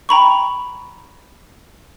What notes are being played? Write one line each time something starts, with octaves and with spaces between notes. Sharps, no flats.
G5 A#5 B5 C#6